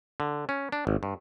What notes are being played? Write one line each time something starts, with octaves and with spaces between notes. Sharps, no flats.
D3
C#4
D4
G#1
G2